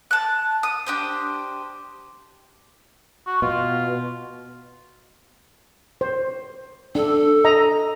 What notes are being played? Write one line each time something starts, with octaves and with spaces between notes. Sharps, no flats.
A5 F#6
D#6
D4 G4 C5
F#4
B2 F4
C5
D4 A4
D#5 A#5